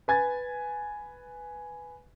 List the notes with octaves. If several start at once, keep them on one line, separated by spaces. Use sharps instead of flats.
B4 G#5 G#6 A6